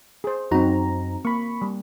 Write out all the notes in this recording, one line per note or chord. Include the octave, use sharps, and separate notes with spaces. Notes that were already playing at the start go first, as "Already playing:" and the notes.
G#4 C5
F#2 C4 D#4 F#4 A#5
A#3 B5 C#6
G3